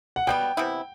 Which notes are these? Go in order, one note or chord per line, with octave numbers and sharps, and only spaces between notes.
F#5
B2 G3 B3 G5
C3 E3 B3 E4